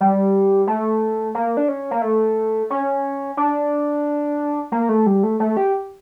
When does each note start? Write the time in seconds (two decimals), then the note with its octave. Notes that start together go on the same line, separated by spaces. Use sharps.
0.01 G3
0.67 A3
1.35 A#3
1.57 D4
1.69 C#4
1.91 A#3
2.02 A3
2.70 C#4
3.37 D4
4.72 A#3
4.89 A3
5.06 G3
5.23 A3
5.40 A3
5.57 G4